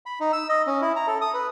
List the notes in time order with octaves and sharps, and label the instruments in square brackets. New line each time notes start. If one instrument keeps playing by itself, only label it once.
[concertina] B5
D#4
E6
D#5
C#4
E4
A#5
A4
D#6
B4